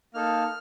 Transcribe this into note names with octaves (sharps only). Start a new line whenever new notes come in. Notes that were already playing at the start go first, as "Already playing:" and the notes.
A#3 D#4 A4 F6